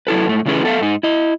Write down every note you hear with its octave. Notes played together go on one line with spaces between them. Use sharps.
F#3 E4 A4 B4
G#2 A3
C#3 E3 A3 C#4 G#4 B4
B3 A4 C5 E5 F5
G#2 D#4
E4 D#5